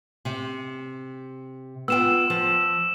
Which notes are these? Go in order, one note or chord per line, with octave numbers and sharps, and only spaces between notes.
C3
B3 F4 G5 E6 E7
F3